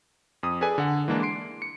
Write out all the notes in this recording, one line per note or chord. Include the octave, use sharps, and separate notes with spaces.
F2 D#6
G#4 A4 B4 D5 G#5
D3 F#5
E3 G#3 A#3 D4
C6 C7 D7
C#7